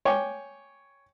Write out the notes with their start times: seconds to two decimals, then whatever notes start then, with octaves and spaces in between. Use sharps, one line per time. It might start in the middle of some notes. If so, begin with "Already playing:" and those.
0.05 C#5 G5 G#5 D6